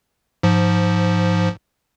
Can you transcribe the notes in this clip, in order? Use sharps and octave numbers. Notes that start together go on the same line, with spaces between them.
G#2 F3